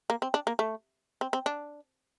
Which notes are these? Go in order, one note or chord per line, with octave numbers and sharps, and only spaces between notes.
A#3
C4
D4
A#3
A3
C4
C4
D4